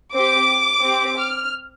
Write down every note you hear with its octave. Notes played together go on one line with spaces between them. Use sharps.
C4 G4 D6
C4 G4
F6